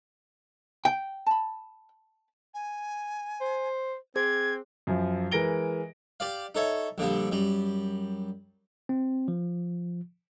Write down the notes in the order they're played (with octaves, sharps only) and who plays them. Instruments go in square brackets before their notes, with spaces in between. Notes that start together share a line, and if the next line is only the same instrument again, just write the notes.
[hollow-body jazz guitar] G5
[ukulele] A5 B5
[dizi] G#5
[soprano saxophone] C5
[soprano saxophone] C4 [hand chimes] G#4 C5 [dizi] G#6
[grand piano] F#2 F3
E3 G#3 A#4 A#6 D7 G7
[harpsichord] G4 D5 F5
D#4 A4 C#5 E5
A#1 D3 F3 G3
F#2 G3
[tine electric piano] C4
F3